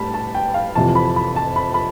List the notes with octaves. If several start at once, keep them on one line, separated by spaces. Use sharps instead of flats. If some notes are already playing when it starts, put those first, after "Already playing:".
Already playing: A2 G3 A5 B5
A5
G5
F5
F2 C3 E3 A5
B5
B5
A5
B5
B5